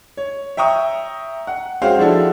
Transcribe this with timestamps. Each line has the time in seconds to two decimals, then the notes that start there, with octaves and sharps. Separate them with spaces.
0.17 C#5
0.57 E5 G5 A#5 C#6 D#6
1.47 F#5
1.82 G#3 C#4 F#4 C5 F5 G5
1.99 F3 G#3 D4 E4 F#4 A4